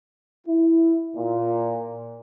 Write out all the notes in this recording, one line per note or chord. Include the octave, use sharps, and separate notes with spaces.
E4
A#2